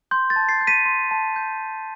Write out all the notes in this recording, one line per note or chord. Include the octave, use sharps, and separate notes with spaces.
C6 G6
A6
A5
A6 C7
G6
B6 D#7
C6
A5
G6